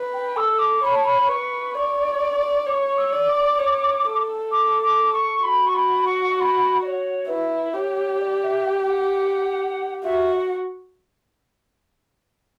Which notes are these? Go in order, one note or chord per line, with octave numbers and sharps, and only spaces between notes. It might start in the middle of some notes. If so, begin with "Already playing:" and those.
Already playing: B4
G5
A4 E6
D6
C#5 B5
A5
B5
B4 C#6
D5 C#6
C#5 D6
C#6
E6
D5
D6
C#5
A4
D6
D6
C#6
F#4 B5
C#6
B5
C#6
C#6
B5
D5
C#5
E4 B4
G4 C#5
D5
E5
G5
F#5
F#4 E5